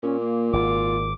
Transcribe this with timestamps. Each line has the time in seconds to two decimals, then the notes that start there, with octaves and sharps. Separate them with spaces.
0.03 A#2 C#4
0.20 A#3
0.53 G#1 F4 D6